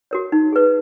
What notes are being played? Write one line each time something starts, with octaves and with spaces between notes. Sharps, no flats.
F#4 A#4 C#5
D#4
G#4 B4